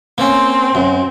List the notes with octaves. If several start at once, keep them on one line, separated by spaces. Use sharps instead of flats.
A#3 C4 C#4
F#2